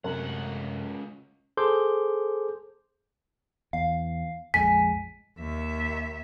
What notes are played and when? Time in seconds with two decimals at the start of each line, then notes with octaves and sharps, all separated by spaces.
0.04 C#2 F#2 C3 A3 A#4 C#5 F#5
1.57 G#4 A4 C5 C6 D6 G6
3.73 E2 F5
4.54 A#1 F2 G#3 G#5 B6
5.39 D#2 E5